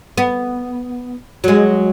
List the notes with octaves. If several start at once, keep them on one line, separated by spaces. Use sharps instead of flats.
B3
F#3 G#3